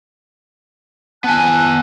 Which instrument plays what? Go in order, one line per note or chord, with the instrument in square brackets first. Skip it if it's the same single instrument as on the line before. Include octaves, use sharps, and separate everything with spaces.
[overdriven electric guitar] B3 G#5 [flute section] A5 F#6